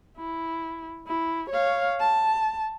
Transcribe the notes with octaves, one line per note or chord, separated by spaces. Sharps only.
E4
E4
C#5 F5
A5